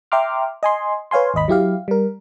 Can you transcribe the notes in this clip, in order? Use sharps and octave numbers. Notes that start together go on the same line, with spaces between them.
E5 G5 A#5 C6 D6 F6
D#5 G#5 C6
B4 C#5 F5 G#5 C6
G#1 D#2 D#5 B5
F#3 E4 G4 F5
G3 A#4